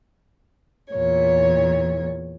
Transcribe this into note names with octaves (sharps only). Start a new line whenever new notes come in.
E2 A#2 C#5